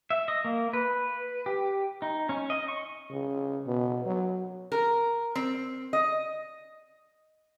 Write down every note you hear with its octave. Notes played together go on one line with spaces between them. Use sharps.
E5
D#5
A#3
B4
G4
D#4
C#4
D#5
C#6
C#3
B2
F#3
A#4
C4
D#5